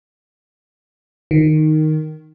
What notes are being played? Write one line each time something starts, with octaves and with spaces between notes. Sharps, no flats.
D#3